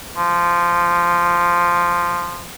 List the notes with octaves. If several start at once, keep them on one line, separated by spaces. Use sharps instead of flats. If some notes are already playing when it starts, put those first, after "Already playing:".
F3